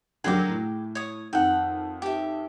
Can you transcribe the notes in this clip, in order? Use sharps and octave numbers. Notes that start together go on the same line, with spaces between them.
D3 F#3 G#4 A#4 G5 D6
A2
C#5 D#6
F2 D#3 F#5 G5
G4 E5